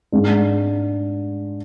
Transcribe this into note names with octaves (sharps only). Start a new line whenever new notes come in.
G#2 G#3 D4